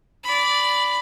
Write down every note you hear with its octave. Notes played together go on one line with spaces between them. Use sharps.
D5 B5